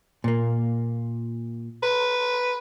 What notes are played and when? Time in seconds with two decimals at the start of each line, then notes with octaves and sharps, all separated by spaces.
0.24 A#2 A#3
1.83 B4